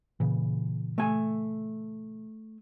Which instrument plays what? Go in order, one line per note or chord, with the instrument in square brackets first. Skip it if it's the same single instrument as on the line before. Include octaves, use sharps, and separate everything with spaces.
[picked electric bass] A#2 C#3 E3
[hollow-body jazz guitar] A3 G#5